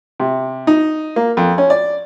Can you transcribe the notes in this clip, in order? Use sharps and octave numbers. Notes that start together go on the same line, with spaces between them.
C3
D#4
A#3
F2
C#4
D5